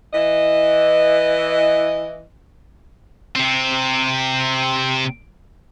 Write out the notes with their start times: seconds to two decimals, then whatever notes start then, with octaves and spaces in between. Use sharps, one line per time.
0.13 E3 D#5
3.35 C3 C4